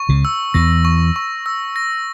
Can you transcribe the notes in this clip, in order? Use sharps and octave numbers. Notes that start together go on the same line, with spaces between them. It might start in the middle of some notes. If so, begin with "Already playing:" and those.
Already playing: C#6
C#2 C#3
E6
E2 E3 A#6
C#6
C#6
E6
A#6